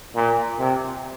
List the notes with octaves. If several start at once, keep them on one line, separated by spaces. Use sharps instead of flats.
A#2
C3